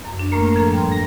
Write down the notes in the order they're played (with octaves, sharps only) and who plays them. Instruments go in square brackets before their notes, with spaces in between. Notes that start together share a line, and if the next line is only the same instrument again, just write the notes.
[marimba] F#2
D4
[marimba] A2 A3 A#3 [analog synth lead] A#4
[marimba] F3 D4 A4
[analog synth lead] G2 [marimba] G5 A#5 C6
[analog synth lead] A#6